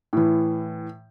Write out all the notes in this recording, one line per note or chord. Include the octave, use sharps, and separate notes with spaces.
A2 E3